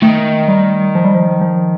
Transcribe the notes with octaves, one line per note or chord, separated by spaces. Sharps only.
D#3 A3
G3
F3
G3
F3
F3